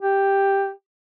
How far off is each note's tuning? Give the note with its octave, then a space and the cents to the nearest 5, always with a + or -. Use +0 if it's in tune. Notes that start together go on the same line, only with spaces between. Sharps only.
G4 +5